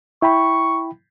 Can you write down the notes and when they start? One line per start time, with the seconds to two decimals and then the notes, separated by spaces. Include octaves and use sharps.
0.22 E4 G5 B5 C#6